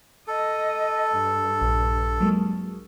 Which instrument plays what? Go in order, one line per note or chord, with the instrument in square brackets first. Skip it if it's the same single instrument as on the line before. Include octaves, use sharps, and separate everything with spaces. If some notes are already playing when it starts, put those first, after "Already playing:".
[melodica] A4 [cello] D#5
[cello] G2
[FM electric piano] A#1
F#3 G#3 A#3